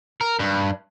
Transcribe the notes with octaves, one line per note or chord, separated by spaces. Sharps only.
A#4
G2